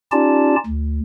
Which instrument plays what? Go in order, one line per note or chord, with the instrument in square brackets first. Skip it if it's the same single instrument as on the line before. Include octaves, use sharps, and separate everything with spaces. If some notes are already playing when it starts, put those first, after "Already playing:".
[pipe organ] C#4 D#4 F4 G4 D5 A5
D2